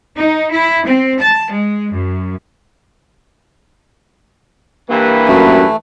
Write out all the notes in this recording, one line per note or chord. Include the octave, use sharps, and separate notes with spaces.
D#4
E4
C4
A5
G#3
F#2
G2 E3 A#3 B4
F#2 A3